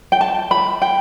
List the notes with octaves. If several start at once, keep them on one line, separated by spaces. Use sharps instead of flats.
G5
A5
B5
G5